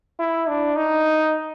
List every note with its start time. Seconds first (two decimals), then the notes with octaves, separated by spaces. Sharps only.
0.19 E4
0.48 D4
0.76 D#4